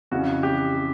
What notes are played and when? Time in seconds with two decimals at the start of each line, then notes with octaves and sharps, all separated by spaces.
0.11 F2 C#3 E3 F#4
0.43 G4